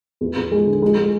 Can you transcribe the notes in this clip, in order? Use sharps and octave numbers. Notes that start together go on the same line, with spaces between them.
E2
E2
G#3
D3
G#3
G#3